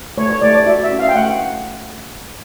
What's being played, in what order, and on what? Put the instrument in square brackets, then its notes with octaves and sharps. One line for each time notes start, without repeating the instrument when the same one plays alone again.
[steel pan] A3 C#5
C#5
A3 D5
D5
F#4 E5
E5
C#4
F5
G5
A3 F#5